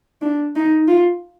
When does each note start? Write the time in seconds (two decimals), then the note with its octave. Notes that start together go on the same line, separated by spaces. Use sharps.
0.22 D4
0.55 D#4
0.88 F4